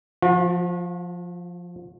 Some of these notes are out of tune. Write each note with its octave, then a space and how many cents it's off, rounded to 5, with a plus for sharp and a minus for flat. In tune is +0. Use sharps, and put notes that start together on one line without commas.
F3 +5 F#4 -40